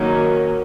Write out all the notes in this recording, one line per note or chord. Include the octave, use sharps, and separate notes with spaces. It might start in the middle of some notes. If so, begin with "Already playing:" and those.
Already playing: D#3 F#3 A#3 C#4